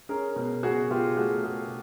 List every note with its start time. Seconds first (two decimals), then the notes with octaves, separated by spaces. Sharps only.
0.09 C#4 G#4 A#4
0.36 B2
0.63 B2 F#4 G#4
0.90 B2 F4 G4
1.17 A3 F#4 G#4
1.43 B2 F#4 G#4